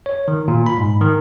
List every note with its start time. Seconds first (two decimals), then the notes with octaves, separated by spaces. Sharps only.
0.06 C#5
0.28 D#3
0.48 A#2
0.66 B5
0.78 G#2
1.01 D#3